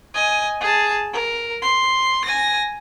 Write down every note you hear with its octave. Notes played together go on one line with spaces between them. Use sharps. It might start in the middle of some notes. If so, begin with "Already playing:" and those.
D#5 G#5
G#4 A5
A#4
C6
G#5 A#6